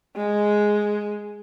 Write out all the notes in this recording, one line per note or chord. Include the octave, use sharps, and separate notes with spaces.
G#3